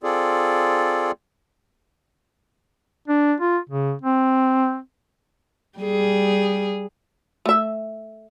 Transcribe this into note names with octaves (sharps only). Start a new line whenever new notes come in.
C4 F4 G#4 A4 D5
D4
F4
C#3
C4
G3 G#4
A3 E5